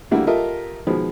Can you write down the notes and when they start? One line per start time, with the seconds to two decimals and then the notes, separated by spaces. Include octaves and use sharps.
0.11 D3 G3 A3 A#3 E4 F#4
0.27 F4 G4 A4 A#4 D#5 E5
0.87 B2 D#3 F3 G#3